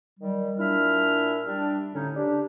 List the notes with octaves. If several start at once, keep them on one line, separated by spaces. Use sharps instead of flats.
D#3 F#3 G3
A#2 D4 E4 E5 F6
G3 D4
A2 D3 C#4 D#4
D4 G4